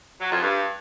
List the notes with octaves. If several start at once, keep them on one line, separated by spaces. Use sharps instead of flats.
F#3
F2
G2